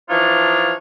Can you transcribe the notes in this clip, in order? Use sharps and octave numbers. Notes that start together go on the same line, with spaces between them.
E3 F3 D4 D#4 F4 C#5